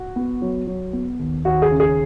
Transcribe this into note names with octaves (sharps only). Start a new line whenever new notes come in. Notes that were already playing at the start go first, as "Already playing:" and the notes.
Already playing: F#4
B3
F#3
F#3
B3
D#2
D#2 F#4
G#4
C#3
G#4